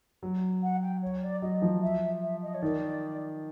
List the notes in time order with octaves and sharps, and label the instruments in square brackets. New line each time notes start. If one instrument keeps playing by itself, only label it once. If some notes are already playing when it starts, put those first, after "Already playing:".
[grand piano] F#3
[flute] F#5
G5
C#5
D5
[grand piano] F#3 [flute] D#5
[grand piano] F3
[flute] E5
E5
D#5
C#5
[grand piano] D#3 [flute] D5